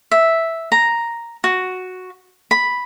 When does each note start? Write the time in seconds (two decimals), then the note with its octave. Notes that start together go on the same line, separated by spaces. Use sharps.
0.11 E5
0.72 A#5
1.44 F#4
2.51 B5